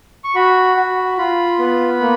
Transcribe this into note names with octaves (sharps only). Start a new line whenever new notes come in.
C#6
F#4 B5
F#4
F4 B5
B3
A#3